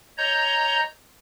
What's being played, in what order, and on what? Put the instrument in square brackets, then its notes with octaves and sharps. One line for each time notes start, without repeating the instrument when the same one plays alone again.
[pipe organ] C#5 D#5 A#5 G6